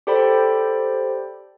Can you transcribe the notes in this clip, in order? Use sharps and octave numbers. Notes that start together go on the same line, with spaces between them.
G4 A4 C5 D5 G5 B5